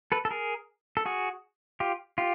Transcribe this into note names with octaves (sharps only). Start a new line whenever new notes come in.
A4 B4
A4
G#4 A#4
A4
F#4 G#4
F4 G4
F4 G4